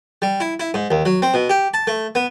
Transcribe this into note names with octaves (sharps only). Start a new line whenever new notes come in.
G3
E4
E4
G#2
D#2
F#3
C4
B2
G4
A5
A3
B3